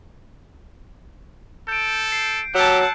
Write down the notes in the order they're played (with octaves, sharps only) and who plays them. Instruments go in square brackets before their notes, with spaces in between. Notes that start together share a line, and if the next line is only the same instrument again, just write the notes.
[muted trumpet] A4 [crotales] G6 D7
[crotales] C7
[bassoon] F#3 [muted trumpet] G4 [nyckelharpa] F#5 A5 [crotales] E6 E7